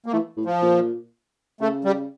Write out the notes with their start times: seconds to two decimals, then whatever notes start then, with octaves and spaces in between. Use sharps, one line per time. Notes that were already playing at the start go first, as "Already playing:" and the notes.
0.06 A#3
0.12 E3 A3
0.37 A2
0.45 F3
0.62 A#2
1.60 C#3 A3
1.85 G3